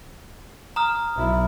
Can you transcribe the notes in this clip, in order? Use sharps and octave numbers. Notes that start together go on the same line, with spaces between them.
A#5 D#6 F6
B1 E4